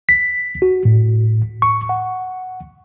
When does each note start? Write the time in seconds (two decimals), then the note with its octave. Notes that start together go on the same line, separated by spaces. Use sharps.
0.09 B6
0.62 F#4
0.85 A2
1.62 C#6
1.89 F#5